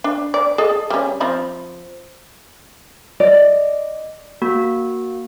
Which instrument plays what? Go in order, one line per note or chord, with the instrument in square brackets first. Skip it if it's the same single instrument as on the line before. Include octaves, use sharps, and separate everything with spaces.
[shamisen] D4
D5
G#4 A4 D#5
G3 C#4
F3 C4 B5
[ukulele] D5 [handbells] D#5
[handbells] A#3 F#4